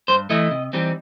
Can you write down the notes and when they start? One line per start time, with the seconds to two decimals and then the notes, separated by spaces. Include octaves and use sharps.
0.08 G2 C5
0.30 E3 A3 E4 D#5
0.51 C3
0.73 E3 G3 C4 D#4